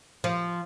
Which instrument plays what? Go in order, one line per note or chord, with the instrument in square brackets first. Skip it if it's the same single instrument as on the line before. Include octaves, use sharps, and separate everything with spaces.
[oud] F3